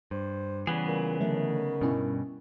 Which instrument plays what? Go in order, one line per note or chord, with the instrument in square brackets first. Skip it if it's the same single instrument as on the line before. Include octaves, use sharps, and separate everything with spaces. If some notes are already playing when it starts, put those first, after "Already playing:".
[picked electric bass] G2 [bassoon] C5
[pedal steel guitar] C#3 B3 G#4 [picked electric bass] E3 [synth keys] G3
[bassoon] A#2
[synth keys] D3 F#3 A3 [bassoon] D#3
[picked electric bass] G2 B2 [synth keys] G3 C#4 E4